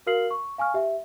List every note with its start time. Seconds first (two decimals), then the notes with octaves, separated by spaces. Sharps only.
0.07 F#4 A#4 F5 F6 C7 F#7
0.31 C#6
0.58 F5 G#5 C#6 F6
0.74 G4 E5